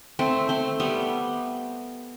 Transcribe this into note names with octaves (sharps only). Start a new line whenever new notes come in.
A3 C4
A3 C4
G3 B3